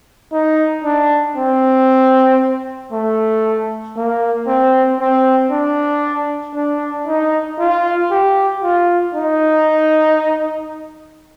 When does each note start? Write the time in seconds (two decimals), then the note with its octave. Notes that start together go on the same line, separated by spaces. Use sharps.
0.33 D#4
0.84 D4
1.36 C4
2.92 A3
3.96 A#3
4.47 C4
5.00 C4
5.51 D4
6.55 D4
7.07 D#4
7.59 F4
8.11 G4
8.63 F4
9.15 D#4